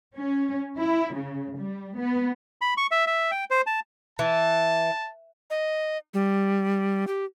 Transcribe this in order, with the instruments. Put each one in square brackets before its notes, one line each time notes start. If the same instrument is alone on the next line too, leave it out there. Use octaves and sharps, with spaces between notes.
[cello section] C#4
E4
C#3
G3
B3
[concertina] B5
C#6
E5
E5
G5
C5
A5
[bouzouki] E3 [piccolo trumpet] A5
[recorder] D#5
G3
G4